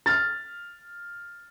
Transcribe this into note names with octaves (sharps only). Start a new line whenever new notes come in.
F6 A6